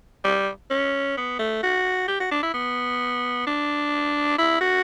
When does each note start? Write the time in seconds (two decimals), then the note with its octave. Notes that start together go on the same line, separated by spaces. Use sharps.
0.24 G3
0.70 C#4
1.17 B3
1.39 A3
1.63 F#4
2.08 G4
2.20 F#4
2.32 D4
2.43 E4
2.54 B3
3.47 D4
4.38 E4
4.61 F#4